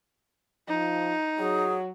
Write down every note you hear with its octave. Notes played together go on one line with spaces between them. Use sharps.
F3 D#4
F#3 G#4